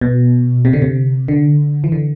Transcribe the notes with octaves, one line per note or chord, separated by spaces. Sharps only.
B2
C3
D3
C3
D3
E3
D3